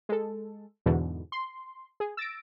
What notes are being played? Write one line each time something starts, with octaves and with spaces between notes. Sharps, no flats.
G#3 A4
E2 G#2 B2 D3 E3
C6
G#4
E6 A6 A#6 D7